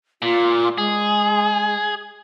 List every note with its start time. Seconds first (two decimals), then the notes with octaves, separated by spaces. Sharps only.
0.22 A#2 F4
0.78 G#3 G#4